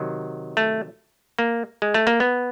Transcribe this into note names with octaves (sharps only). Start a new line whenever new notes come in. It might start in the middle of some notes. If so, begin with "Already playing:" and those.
Already playing: C3 D#3 F#3
A3
A#3
G#3
A3
A#3
B3